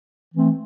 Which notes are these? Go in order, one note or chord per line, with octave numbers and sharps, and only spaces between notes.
E3 A3 C4